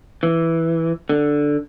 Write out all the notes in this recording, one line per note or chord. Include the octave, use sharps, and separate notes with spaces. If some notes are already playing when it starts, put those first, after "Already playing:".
E3
D3